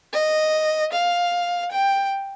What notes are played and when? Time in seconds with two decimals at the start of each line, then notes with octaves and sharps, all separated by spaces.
0.13 D#5
0.92 F5
1.72 G5